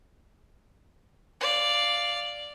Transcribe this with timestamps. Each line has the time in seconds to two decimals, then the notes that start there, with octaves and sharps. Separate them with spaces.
1.41 D5 F5